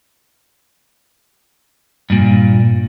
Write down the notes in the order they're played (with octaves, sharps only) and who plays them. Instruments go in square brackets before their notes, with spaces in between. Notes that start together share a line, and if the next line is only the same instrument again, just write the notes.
[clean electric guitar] G2 A#2